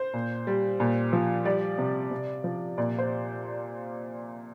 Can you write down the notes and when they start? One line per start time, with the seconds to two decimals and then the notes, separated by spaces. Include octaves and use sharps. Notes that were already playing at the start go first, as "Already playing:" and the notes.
Already playing: C5
0.14 A#2
0.47 G3
0.80 A#2
1.13 F3
1.45 G3 D5
1.78 C3
2.11 C3
2.44 F3
2.78 A#2 D5
2.99 C5